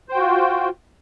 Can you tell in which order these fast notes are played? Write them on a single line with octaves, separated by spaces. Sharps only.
C5 G5 F#4 F4